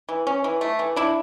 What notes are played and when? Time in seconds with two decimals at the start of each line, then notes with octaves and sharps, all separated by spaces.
0.09 E3
0.27 C#4
0.44 E3
0.61 A3
0.79 E3
0.96 D4 E4